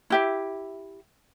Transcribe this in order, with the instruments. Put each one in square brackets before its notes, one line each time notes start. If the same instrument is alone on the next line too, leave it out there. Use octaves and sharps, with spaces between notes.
[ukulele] E4 G4 E5